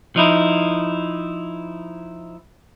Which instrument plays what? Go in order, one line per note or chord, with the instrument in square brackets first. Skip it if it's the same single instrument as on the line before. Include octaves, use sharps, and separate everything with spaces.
[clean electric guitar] F3 D#4 E4